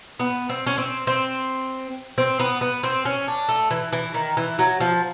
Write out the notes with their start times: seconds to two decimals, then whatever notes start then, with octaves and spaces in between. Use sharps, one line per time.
0.20 B3
0.50 C4
0.66 C#4
0.78 C4
1.07 C4
2.18 C4
2.40 B3
2.61 B3
2.83 C4
3.05 C#4
3.28 D4
3.48 A3
3.71 E3
3.93 E3
4.14 D#3
4.37 E3
4.59 F#3
4.80 F3